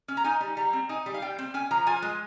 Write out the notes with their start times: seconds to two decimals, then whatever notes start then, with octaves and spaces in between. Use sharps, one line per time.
0.08 C#4
0.17 A#5
0.24 D#4 G#5
0.41 G3
0.57 G3 A#5
0.73 C4
0.89 D#4 G#5
1.06 G3
1.14 F5
1.22 G3 G5
1.39 C4
1.54 C#4 G#5
1.71 F3 A#5
1.86 F4 G#5
2.02 G#3